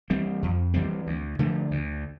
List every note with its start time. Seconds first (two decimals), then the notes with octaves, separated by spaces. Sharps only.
0.10 E3 G3 C4
0.43 F2
0.74 E3 G3 C4
1.07 D2
1.39 D3 F3 A3
1.71 D2